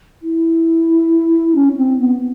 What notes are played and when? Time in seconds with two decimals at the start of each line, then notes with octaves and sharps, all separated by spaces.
0.22 E4
1.55 C#4
1.72 C#4
1.76 C4
1.99 B3